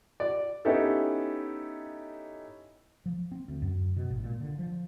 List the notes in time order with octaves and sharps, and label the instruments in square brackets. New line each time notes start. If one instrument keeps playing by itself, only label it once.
[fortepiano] D5
[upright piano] B3 C#4 D#4 E4 G4 A4
[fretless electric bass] F3
C4
D2
F#2
B2
G#1
A#2
D3
F3